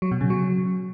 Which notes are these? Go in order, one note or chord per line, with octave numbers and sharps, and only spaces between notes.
F#3
B2
C#3
F#3